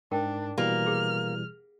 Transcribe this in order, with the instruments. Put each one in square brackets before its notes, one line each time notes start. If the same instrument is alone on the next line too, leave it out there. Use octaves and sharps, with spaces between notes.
[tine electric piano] G#2 [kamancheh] D4 [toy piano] A#4 G5
[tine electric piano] B2 E3 G3 [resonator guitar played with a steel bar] A#3 [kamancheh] F6
[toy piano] G4 G#4